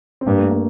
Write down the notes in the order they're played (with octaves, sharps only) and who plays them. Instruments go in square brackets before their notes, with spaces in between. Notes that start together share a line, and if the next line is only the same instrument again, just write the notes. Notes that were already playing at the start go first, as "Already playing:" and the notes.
[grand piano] C4
[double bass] G2 [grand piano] A#3
[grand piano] A3
A#3